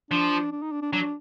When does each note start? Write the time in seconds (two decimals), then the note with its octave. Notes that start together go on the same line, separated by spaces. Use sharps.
0.11 F3 D4
0.52 D4
0.62 D#4
0.72 D4
0.82 D4
0.93 F#3 D4